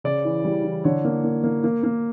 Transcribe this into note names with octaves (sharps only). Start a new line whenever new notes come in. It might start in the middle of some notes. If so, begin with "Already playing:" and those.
C#3 D5
E3
G3
E3
D3 C#5
A#3
A#3
A#3
A#3
A#3